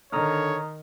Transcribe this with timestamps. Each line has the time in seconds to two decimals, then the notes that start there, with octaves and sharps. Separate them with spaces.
0.12 D3 D#3 C#5 A#5 D#6 F6